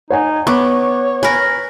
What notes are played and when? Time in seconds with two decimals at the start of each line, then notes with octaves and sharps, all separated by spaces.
0.10 D#4 C#5 F#5 G#5
0.47 B3 C#5 C#6 D6 F#6
1.23 A#4 B4 G#5 G#6